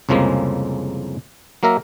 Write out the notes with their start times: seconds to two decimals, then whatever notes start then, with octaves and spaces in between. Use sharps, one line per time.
0.09 C2 F2 C#3 F3 G#3 A#3
1.63 F#3 A#3 A#4 E5 A#5